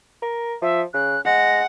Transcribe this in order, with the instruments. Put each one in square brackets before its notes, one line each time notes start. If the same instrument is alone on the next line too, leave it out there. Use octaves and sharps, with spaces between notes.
[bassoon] A#4
[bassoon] F3 [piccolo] E5
[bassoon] C#3 [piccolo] F#6
[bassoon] G#3 [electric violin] F#5 [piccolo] A#6